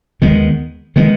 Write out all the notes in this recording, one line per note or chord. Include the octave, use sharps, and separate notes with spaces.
D#2 D#3 G#3 B3
D#3 G#3 B3